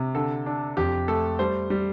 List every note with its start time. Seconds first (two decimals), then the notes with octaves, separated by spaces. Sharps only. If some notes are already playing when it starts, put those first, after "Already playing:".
Already playing: C3
0.15 D3 A4
0.46 D4
0.77 F2 G4
1.08 A3 A4
1.39 G3 C5
1.70 G3